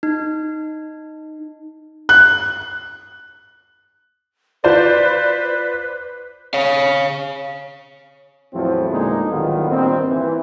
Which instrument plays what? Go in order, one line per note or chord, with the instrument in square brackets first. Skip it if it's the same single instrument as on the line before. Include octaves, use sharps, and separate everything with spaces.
[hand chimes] D#4
[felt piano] F#6
[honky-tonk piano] F4 C5 D5 [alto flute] B4
[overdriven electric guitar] C#5 F5
[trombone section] E2 A2 F3 F#3 C4 E4
E2 A#2 D3 G#3 D#4
A1 D#3 F#3 G3 B3 F4
G2 A#2 D#3 C4
E3